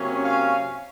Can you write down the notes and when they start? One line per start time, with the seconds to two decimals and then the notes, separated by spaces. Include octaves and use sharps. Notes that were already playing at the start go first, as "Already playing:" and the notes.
Already playing: C3 F#3 A#3 C#4
0.24 F5 G#5